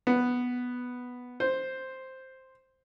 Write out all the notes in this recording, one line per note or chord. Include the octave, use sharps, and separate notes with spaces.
B3
C5